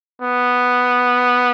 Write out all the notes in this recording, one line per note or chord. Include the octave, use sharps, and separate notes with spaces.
B3